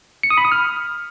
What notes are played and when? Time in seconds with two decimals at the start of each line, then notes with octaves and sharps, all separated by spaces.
0.23 C#7
0.30 D#6
0.38 B5
0.45 D#6
0.52 F6